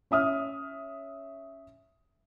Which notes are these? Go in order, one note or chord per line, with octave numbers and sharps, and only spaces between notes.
C#4 E5 D#6 F6